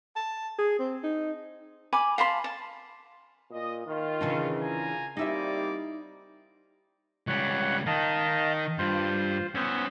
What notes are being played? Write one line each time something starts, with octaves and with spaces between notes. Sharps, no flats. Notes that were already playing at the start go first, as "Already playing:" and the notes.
A5
G#4
C4
D#4
G#5 B5 D6
F5 A5 B5 C6
A5
A#2 D#5
D#3 F4
C#3 E3 D4
F4 G#5 A#5
G3 A#3 C4 D#4 E4 D5 E5
C#2 G3 C#5 F#5 F#6
D#3 D#5 F5 A5
G2 F4 C5
B3 C#4 C5 E6 G#6